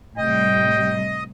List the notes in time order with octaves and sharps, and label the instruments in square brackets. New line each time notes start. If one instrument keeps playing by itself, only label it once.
[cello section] A2 C3 G3 [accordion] D#5 [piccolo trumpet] G5